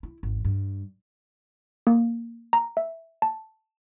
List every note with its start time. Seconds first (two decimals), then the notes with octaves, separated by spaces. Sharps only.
0.03 E4
0.23 G#1 E2
0.45 G2
1.87 A#3
2.53 A#5
2.77 E5
3.22 A5